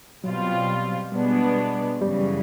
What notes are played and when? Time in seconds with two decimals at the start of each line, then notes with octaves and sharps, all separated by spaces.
0.24 B2 F#3 G3 C4 F4
1.12 B2 G3 G#3 B3 D4
2.01 F#2 C#3 E3 G3